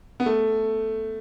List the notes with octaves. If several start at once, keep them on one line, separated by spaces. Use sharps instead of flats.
B3
A3